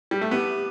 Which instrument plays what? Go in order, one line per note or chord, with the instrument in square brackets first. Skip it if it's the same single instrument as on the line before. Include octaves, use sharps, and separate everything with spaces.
[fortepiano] G3
A3
[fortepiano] B3 [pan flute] G4